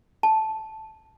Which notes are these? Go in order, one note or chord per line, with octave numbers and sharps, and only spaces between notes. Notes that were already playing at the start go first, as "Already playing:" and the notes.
A5